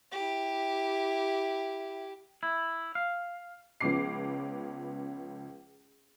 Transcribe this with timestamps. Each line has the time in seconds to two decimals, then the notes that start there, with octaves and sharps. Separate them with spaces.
0.12 E4 G4
2.43 E4
2.95 F5
3.80 C#2 F3 B3 C#4 D6 C7